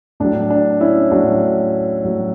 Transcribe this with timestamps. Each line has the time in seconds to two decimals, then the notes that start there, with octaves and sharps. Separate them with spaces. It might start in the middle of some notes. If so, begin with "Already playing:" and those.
0.20 A2 F#3 D4
0.50 D4
0.80 C#4 E4
1.11 A2 F#3 D4 F#4
2.04 A2 F#3